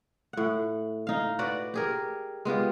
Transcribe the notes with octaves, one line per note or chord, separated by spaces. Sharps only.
A2 F#5
D#4 F5
F#4 B4 D5 F#5
G4 G#4 A#4
G#3 B3 F4 G4